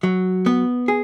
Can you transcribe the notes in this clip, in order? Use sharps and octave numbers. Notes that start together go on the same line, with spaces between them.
F#3
B3
G#4